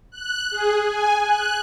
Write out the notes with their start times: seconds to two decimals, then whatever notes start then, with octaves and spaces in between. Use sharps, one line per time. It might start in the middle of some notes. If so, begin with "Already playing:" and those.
0.12 F#6
0.51 G#4
0.84 G#5
1.24 F#6